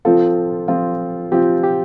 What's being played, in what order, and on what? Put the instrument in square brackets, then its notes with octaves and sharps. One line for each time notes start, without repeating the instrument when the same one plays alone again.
[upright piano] F3 C4 F4 [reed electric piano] A4
[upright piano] F3 C4 F4
[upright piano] F3 C4 F4 [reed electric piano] G4
[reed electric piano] G4